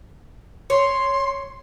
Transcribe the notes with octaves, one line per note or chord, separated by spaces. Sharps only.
C#5 C6